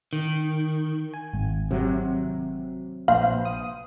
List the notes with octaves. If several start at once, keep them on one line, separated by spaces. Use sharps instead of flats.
D#3
G#5
G#1
C3 F#3
A#1 B4 C5 F5
D#6